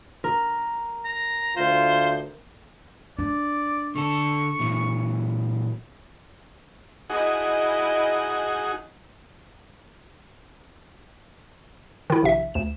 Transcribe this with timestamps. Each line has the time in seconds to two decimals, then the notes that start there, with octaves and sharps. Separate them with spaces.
0.24 A#4
1.05 A#5
1.57 D2 F4 C5
3.18 D4 D5
3.96 D3 A4 C#6
4.59 A#2 E3 F#3
7.10 D#4 E4 F#4 G#4 D#5
12.10 D#3 E4
12.22 A#1 C3 E5
12.54 D2 E7